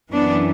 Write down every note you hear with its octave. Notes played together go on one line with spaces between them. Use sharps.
F#2 E3 B3 D4